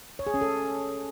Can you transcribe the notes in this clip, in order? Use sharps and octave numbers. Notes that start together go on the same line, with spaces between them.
C#5
G#4
C#4
A4